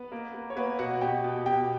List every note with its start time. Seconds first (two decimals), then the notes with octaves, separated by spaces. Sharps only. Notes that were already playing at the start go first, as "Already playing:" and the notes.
Already playing: B3 B4
0.12 A#3
0.34 A#3
0.50 C#5
0.56 A#3 B3 B4
0.79 B2 F#4 F#5
1.01 B2 G4 G5
1.24 B2
1.46 B2 G4 G5